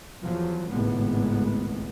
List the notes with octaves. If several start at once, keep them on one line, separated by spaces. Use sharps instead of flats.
E2 F3 F#3
G#1 C#2 A2 G#3 B3